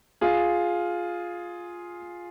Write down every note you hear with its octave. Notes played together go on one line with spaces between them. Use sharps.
F4 G#4